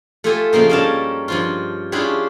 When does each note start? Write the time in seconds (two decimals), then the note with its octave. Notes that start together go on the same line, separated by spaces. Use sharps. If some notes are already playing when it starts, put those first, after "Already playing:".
0.24 A3 F4 G4 A4 G#5
0.53 C#3 F3 A#3 D#4
0.69 G2 G3 C#4 A#4 A5
1.28 G2 F3 F4
1.92 C#4 D4 E4 F4 G4 G#4